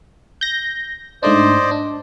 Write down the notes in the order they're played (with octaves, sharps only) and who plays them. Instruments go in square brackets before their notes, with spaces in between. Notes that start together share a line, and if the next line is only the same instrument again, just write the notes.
[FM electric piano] G6 A#6
[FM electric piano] G#2 A3 D4 [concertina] C5 D5 D#5
[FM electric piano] D4